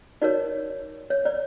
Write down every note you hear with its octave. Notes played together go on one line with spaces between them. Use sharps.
D#4 F#4 A#4 C#5 D5
C#5
D5